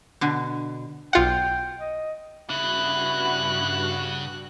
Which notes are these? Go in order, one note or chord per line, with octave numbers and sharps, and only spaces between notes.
B2 D3
B1 F4 F#5 G5
D#5
G2 C#3 E4 F#4 F#6